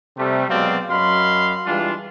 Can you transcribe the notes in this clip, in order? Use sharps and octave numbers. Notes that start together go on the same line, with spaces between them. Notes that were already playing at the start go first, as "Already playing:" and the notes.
C3 G3 A3
B2 F#3 G#3 C4 D5 F5
F#2 F#3 D#5 F5 B5 C6
E3 G3 G#3 D4 F4